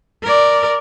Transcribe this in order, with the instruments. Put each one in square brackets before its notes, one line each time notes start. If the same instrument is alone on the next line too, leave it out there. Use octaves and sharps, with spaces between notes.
[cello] A#4 D5